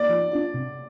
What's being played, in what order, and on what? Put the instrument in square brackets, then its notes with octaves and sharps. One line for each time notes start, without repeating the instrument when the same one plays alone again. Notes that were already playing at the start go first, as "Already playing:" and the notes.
Already playing: [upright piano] D5
[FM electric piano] F3
D4 F4 D5
C3